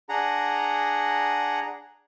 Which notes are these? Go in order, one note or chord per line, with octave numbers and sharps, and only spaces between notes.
D4 G#4 F#5 A#5